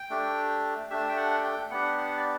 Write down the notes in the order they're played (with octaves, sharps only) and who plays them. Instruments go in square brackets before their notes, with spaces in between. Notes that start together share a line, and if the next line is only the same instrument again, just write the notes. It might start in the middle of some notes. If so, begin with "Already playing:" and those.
Already playing: [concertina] G5
A3 D4 G4
A3 D4 G4 E5
G5
F#5
G5
B3 D4 G4 F#5
F#5
D5